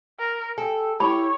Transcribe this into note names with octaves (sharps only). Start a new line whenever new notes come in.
A#4
G4 A4 G#5
E4 G4 C#5 B5